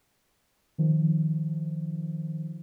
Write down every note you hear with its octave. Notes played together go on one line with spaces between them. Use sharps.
D#3 F3